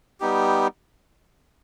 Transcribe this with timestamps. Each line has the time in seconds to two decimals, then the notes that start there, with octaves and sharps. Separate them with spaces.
0.20 G3 B3 D#4 G4